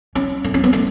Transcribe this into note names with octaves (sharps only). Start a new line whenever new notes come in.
C#4
A3
C#4
B3
A3